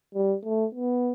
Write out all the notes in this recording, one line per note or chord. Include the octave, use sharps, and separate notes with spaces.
G3
A3
B3